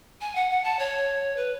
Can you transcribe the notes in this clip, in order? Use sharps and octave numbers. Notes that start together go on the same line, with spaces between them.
G#5
F#5
F#5
A5
C#5
B4